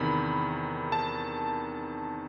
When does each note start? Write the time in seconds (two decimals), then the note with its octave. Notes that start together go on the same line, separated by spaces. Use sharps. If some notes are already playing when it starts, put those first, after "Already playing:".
Already playing: E2 C3 D#3 B5
0.92 A5